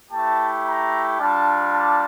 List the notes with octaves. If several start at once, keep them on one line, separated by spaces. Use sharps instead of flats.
A3 E4 G4 A5
A#5
G3 D4 F4 A5
A5